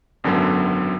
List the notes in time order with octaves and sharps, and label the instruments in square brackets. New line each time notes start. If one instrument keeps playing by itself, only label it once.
[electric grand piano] G#1 F#2 D3 F#3 B3